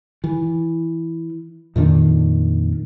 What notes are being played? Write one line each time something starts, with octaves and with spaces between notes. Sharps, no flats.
E3
F2 A#2 D#3 D4